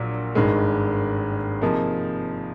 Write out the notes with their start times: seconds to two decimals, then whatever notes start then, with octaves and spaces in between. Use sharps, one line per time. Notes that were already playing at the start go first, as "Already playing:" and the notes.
Already playing: A#1 A#2 F#3 D4
0.35 G#1 G2 D#3 G#3
1.62 C3 F3 A#3 D#4 G#4